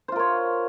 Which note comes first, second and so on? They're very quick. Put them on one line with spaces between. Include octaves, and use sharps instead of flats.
C5 F4 A#4 C#5